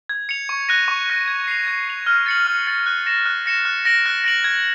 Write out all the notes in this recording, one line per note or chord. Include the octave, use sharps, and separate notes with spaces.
G#6
C#7 F7
C#6
F#6 A#6 D#7
C#6
F#6 A#6 D#7
G#6
C7 F7
G#6
C7 F7
F6
A6 C#7 F#7
F6
A6 C#7 F#7
F#6
A#6 C#7 E7
F#6
A#6 C#7 E7
F#6
A#6 D7 F#7
F#6
A#6 D7 F#7
G#6